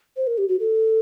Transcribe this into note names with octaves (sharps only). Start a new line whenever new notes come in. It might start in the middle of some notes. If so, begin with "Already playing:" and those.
C5
A#4
G4
F#4
A4